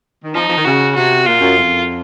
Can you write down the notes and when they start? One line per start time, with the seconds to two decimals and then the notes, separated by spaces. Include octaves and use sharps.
0.24 D#3
0.35 F3 D#4
0.49 F3
0.57 D#3
0.65 C#3 F#4
0.95 C3 F#4
1.26 A#2 F4
1.41 F#2
1.56 F2